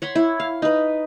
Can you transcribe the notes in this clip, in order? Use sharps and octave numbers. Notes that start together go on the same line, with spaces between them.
C#5 F#5 B5 C6
E4
F5
D#4 B4